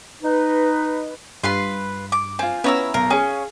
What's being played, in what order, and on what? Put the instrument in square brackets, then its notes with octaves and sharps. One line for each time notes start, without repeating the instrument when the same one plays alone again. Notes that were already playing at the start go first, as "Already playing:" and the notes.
[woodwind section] D#4 B4
[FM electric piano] G2 [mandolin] F4 B4 C6
[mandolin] D6
[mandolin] C4 [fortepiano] F4 G#5
[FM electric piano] B3 C#4 [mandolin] E4 A#5 E6
[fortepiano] B1 [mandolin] A#4 [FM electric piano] F5
[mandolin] C#4 [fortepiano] G#4 G#5